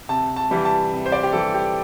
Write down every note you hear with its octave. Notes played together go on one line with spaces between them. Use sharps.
C3 A5
A5
E3 G3
A5
C3
C5
D5
G4
E3 G3 A4
G4